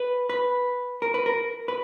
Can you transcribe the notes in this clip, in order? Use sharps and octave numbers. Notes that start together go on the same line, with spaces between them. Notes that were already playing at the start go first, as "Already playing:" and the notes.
Already playing: B4
B4
A#4
B4
A#4
B4